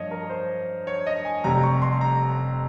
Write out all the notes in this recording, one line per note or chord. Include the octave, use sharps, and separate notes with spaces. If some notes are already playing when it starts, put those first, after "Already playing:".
Already playing: G2 F3 A#3 C#5 D#5
A#4
C5
C#5
D#5
G#5
F1 F2 C3 G3 A#5
C#6
C6
A#5